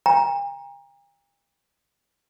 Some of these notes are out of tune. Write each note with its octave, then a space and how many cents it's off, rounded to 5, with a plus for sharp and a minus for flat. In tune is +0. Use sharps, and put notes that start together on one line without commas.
G5 +45 A#5 +15